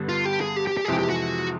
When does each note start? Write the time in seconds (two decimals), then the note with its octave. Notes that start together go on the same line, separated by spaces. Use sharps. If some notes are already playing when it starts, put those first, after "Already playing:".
Already playing: G2 D3 G3 B3
0.09 F4
0.25 G4
0.41 G#4
0.56 G4
0.67 G4
0.77 G4
0.85 G#4
0.88 F2 C3 E3 G#3 G4
0.99 G4
1.09 F#4